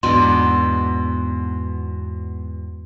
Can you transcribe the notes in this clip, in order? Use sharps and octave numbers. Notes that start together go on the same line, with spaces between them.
E2 G#2 B2 D4 G#5 C6